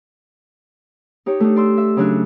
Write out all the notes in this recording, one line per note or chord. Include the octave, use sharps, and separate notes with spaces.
D#4 G4 C#5
A3 D4 D#4
D5 C6 E6
E5
C#3 F#3 D4 F#4